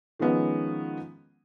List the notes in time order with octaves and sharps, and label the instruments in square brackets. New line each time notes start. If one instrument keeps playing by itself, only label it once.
[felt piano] D#3 F3 G#3 B3 C#4